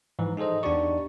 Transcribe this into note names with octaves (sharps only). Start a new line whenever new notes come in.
G#2 E3 F3
D#4 G#4 A4 C5 D#5
E2 D4 D#4 G4 D5 C#6